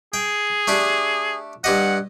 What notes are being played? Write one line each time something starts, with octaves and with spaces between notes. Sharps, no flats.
G#4 G5
A3 D4 G4
G2 G4 D#5 F#5